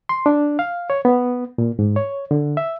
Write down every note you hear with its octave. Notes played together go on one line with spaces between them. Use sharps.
C6
D4
F5
C#5
B3
A#2
G#2
C#5
D3
E5